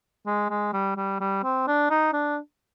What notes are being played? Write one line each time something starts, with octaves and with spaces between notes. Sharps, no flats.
G#3
G#3
G3
G3
G3
C4
D4
D#4
D4